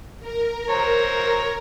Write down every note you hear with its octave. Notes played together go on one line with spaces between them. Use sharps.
A#4
C5 C#5 A#5